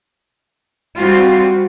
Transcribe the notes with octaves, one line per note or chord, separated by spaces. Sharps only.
G3 C4 F4 F#4